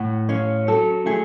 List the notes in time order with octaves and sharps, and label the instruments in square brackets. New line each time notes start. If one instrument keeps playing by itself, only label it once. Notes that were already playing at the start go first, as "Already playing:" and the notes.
Already playing: [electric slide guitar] A2 [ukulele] F#5
[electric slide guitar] C#4 [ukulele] C#5 F5
[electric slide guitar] F#3 [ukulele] A4
[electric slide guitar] A3 [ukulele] G#4